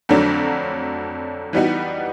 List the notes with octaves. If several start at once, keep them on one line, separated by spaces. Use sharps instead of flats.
F2 D3 F#3 A3 D4
E3 G3 B3 D#4 F#4